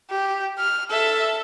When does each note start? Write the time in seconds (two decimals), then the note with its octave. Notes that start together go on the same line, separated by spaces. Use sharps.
0.10 G4
0.58 F6
0.91 A4 E5